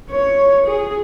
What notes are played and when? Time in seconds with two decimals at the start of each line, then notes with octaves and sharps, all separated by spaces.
0.11 C#5
0.67 G#4